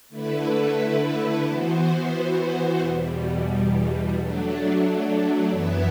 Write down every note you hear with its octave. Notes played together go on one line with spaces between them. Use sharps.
D3 A3 E4 B4
E3 B3 F#4 C5
E2 B2 G3
F#3 A3 D4
F#2 E3 B3 E4 B4